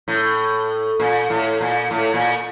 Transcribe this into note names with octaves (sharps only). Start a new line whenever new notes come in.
A2
A#2
A2
A#2
A2
A#2